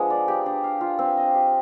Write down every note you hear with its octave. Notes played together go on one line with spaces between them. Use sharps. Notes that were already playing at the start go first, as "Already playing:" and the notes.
Already playing: F3 G#3 B3 D4
D5
G4
D4
F5
F4
C4
D#5
G4